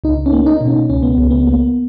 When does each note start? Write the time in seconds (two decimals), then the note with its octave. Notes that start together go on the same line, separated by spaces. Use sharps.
0.04 C#2 D#4
0.26 C#4
0.33 A#3
0.46 D#4
0.61 B2
0.68 C#4
0.90 C#2 C#4
1.03 B3
1.18 C#2
1.31 B3
1.47 A#3